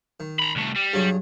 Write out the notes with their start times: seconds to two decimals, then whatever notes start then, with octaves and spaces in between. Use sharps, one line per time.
0.20 D#3
0.40 A#5 B5
0.56 C2 A3
0.76 G3
0.94 G2 F#3 G#4